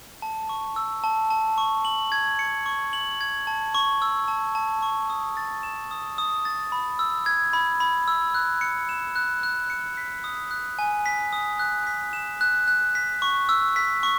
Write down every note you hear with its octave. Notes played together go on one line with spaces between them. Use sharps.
A5
C#6
E6
A5
A5
C#6
F#7
G#6
C#7
C#6
F#7
G#6
A5
C#6
E6
A5
A5
C#6
D#6
A6
E7
D#6
D#6
A6
B5
E6
G#6
B5
B5
E6
F#6
C#7
E7
F#6
F#6
C#7
B6
D#6
F#6
G#5
B6
D#6
F#6
B6
E7
F#6
F#6
B6
C#6
E6
B6
C#6